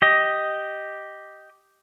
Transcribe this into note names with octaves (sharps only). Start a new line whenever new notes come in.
G4 D#5